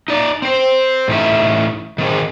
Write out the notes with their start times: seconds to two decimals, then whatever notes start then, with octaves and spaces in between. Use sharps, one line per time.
0.08 D#4 D5
0.42 C4 C5
1.08 A2 E3 C#4 D#4 E5
1.98 D#3 C4 G#4